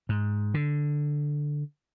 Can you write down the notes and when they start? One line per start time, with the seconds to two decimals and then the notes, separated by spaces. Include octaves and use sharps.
0.09 G#2
0.54 D3